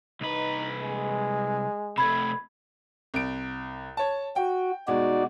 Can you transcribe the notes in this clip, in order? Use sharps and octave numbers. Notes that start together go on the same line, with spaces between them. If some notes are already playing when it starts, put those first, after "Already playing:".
C2 D#4 B4
G#3
C3 A3 B5 G#6
C2 D7
C#5 A5
F#4 G5
B2 G#3 D#4 F#4 D5